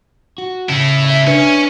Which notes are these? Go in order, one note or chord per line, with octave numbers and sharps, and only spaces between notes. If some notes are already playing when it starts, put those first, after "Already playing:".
F#4
C#3 E4 A4
E5
C#4 D4 B4
G#5